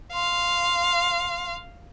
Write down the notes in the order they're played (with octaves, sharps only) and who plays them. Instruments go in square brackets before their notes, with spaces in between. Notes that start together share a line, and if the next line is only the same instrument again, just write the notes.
[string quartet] F5 [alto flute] C6